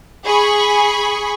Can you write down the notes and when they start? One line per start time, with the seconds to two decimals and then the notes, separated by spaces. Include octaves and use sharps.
0.24 G#4 B5 C#6